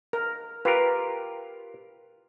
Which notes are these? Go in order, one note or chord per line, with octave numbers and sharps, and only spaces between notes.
A#4
F4 G4 A#4 B4